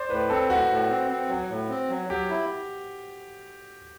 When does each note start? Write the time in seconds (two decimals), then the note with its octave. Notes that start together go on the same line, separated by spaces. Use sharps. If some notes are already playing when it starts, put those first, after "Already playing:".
Already playing: C5 D5
0.10 A2 B4
0.30 C4 A4
0.50 A2 F#4
0.70 A2
0.90 C4
1.09 C4
1.29 F#3
1.50 A2
1.70 C4
1.90 F#3
2.10 F#3 G4
2.30 E4